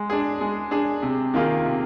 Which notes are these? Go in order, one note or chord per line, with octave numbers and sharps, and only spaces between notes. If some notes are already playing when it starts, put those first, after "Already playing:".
Already playing: G#3
D4 G#4
G#3
D4 G#4
C3
D#3 A#3 F4 G#4
C3